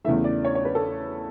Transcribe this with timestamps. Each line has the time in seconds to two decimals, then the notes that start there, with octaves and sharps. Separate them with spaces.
0.05 E2 C#3 E3 A3 E5
0.24 D5
0.45 C#5
0.55 C#5
0.65 B4
0.75 A4